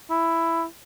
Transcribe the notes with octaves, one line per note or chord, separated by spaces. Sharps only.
E4